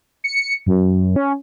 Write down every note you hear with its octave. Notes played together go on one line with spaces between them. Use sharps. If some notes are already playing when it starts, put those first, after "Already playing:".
C#7
F#2
C#4